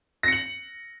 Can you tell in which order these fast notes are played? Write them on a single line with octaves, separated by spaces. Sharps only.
A#6 C#7 F#7